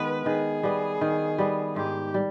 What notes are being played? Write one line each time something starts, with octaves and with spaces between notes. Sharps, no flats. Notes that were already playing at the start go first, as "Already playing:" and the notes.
Already playing: D#3 G#3 B3 B4
D#3 G#4
G3 B3
D#3
G3 B3
G#2 G4
G3